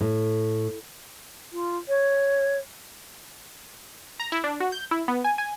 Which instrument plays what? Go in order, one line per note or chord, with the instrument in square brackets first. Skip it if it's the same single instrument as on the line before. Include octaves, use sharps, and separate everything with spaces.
[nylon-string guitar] A2
[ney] F4
C#5
[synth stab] A#5
E4
D4
F#4
G6
E4
B3
G#5
G#5